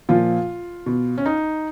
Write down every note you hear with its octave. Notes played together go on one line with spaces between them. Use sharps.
A#2 F3 F4
B2
C#4
D#4